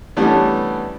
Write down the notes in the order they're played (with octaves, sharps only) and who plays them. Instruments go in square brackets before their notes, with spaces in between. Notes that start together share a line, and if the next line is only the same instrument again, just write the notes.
[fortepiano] E3 G3 A3 B3 C#4 D4